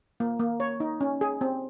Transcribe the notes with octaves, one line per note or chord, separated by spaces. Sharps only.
A#3
A#3
C#5
D#4
C#4
G#4
C4